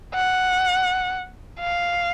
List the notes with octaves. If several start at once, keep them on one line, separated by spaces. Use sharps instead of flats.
F#5
F5